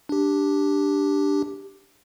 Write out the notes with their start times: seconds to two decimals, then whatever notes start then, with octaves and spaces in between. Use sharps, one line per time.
0.09 D4 G4